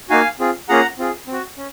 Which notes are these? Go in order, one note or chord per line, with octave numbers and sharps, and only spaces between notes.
A#3 D#4 F#4 F5 G#5
C4 F4 G#4
A#3 C#4 F4 G#4 F#5 A#5
C4 F4 G#4
C4 F#4
C#4